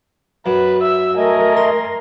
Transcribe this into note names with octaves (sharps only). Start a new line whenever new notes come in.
F#2 B4
E5 E6
A3 A#4 D#5 G#5
C6